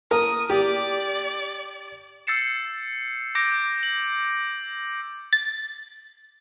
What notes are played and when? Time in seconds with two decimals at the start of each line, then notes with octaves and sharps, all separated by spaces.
0.11 A#4 D#6
0.50 G4 D5
2.27 E6 G6 A6 C7 C#7 E7
3.35 D6 G6 A#6 D7
3.83 F#7
5.33 A6